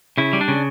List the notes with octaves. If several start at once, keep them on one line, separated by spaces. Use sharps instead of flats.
C#3 E4
G3
D4
C#3